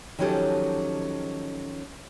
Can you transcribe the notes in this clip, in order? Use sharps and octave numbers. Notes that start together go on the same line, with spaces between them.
D#3 F3 F#3 C#4 G4 A4